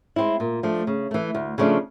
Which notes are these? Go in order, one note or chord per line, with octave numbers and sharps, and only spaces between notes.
G#3 C4 E4
A#2
F3 A3 D4
C#3
E3 A3
D2
C#3 F3 A3 D4